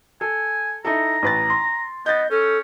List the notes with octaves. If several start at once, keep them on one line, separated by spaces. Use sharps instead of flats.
A4 G#5
D#4 E4 A4 A#5
A1 B4 A6
C6
B3 D#5 G6 A6
C#4 A4